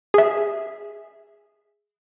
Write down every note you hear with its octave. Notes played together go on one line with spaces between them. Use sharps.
G#4 E5